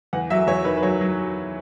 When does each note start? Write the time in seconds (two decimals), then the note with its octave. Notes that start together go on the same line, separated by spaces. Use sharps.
0.13 E2 F#5
0.30 F#3 E5
0.47 E2 C#5
0.65 D#3 B4
0.77 B4
0.83 F#3 C#5
1.01 F#3